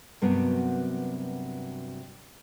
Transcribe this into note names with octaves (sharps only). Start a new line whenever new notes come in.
G2 C3 F#3 A#3 B3 F#4